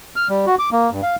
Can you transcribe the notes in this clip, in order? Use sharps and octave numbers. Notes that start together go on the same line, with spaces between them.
F6
G3
F#4
D6
A#3
G2
F5